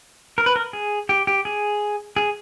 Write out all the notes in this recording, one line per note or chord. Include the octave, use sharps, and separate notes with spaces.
A#4
B4
A#4
G#4
G4
G4
G#4
G#4